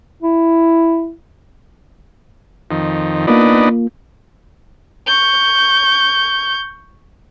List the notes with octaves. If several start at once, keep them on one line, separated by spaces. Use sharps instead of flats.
E4
F2 D#3
A#3 B3 D4 D#4 F4
C#6 G6